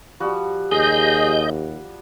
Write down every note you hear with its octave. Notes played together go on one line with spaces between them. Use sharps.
F3 G3 F#4
D#2 G#4 D#5 G6